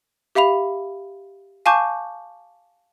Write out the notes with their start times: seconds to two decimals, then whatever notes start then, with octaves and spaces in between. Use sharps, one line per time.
0.35 G4 E5 F5 B5 F7
1.66 F5 G#5 A5 C#6 D6 G6